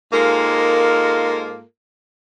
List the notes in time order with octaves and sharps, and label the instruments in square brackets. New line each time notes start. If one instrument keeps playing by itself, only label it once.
[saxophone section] G#2 G#3 A#3 F4 A4 A#4